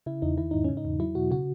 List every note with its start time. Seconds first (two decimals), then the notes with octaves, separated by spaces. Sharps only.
0.06 C#3 E4
0.22 E2 D#4
0.38 D#3 E4
0.51 G#2 D#4
0.64 C#3 C#4
0.77 D#4
0.85 E2
1.00 F#3 E4
1.15 B2 F#4
1.31 C#3 F#4